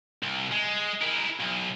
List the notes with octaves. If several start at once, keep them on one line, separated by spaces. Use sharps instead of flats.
C2
G#3
E4 A#4
B1